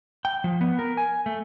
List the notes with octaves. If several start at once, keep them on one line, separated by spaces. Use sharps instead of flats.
G5
F3
B3
A#4
G#5
A3